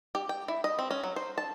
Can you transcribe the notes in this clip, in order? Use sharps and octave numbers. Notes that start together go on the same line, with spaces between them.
G4
G5
E4
D#5
C4
C#4
F#3
C5
A5